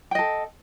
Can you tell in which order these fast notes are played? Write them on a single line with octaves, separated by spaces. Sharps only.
G5 D#5 A4